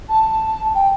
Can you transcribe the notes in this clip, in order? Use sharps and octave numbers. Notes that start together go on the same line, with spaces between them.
A5
G5